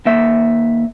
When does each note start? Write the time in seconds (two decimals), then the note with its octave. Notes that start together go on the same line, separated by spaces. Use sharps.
0.05 D#2 A#3 E5